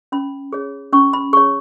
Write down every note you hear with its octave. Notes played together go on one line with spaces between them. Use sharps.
C#4 B5
G#4 C#5
C#4 C#6
B5
G#4 C#5 C#6